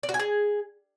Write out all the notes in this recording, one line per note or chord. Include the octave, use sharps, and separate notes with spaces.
D5
F#4
G#5
G#4